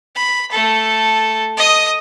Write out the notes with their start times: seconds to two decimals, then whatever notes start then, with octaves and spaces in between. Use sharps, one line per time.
0.15 B5
0.51 A3 A4
1.57 D#5 D#6